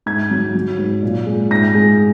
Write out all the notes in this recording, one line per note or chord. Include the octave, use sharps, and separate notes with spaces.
G#2 G#6
F#3
F#3
G#2
A#2
G#3
G#2 A#6
G#3